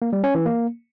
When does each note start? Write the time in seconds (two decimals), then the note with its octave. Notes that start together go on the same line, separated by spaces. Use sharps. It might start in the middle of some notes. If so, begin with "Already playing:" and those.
0.02 A#3
0.13 G3
0.24 C#4
0.35 E3
0.46 A#3